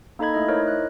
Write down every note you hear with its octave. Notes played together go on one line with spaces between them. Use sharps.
A#3 D#4 A4 D#5 B5 G#6
A3 E4 D#5
D#4 E4 A#4 C5 C#5 D#5
F#6